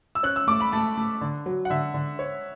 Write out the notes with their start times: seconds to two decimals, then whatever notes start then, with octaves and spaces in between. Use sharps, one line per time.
0.15 E6
0.23 C#4 F#6
0.36 E6
0.47 A3 D6
0.60 B5
0.72 A3 A5
0.97 A3
1.21 D3
1.46 F#3
1.65 F#5
1.70 D3 E5
1.94 D3
2.19 C#5